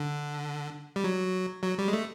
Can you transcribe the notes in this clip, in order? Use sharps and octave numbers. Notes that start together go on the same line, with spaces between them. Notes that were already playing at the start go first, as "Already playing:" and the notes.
Already playing: D3
G3
F#3
F#3
G3
G#3
A3